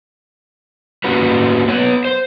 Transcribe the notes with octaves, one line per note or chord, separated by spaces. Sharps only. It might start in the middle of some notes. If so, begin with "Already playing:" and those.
A#3 C#4 F#4 B4
B3 B4 C#5
C5